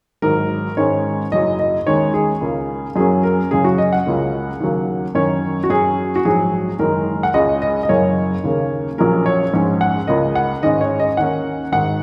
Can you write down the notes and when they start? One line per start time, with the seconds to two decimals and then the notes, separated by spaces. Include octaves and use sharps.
0.22 G#1 G#2 F#3 A#4
0.77 G#2 D#3 G#3 C#4 C#5
1.32 F#1 F#2 F#3 D#5
1.59 D#5
1.86 D#2 D#3 G#3 C#4 C#5
2.14 G#4
2.41 C#2 C#3 A#3
2.96 F#2 F#3 A#3 C#4 G#4
3.23 A#4
3.51 F#2 C#3 F#3 C#4 G#4
3.64 F#4
3.78 D#5
3.93 F#5
4.06 C#2 C#3 A#3 C#4
4.60 D#2 C#3 F#3 A#3
5.15 F#2 D#3 A#3 C#4 C#5
5.64 F#4
5.70 F#2 F#3 C#4 G#4
6.15 F#4
6.25 A#1 G#2 F#3 G#4
6.79 F#1 F#2 D#3 G#3 A#4
7.23 F#5
7.34 C#2 C#3 G#3 C#4 D#5
7.62 D#5
7.83 D#5
7.89 F#1 F#2 C#3 A#3 C#4 C#5
8.44 D#2 C#3 A#3
8.98 A#1 A#2 F#3 A#3 C#4 A#4
9.26 C#5
9.53 A#1 G#2 G#3 C#4
9.81 F#5
10.07 C#2 C#3 A#3 D#5
10.35 F#5
10.63 G#1 G#2 G#3 C#4 D#5
10.81 C#5
11.00 D#5
11.17 D#2 D#3 A#3 C#4 F#5
11.72 G#1 G#2 D#3 F#5